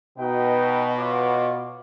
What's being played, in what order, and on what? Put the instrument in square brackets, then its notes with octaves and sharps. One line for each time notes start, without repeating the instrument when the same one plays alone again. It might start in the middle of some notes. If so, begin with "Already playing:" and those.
[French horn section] B2 [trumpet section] D#4 B4 G5
[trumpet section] F4 C#5 D6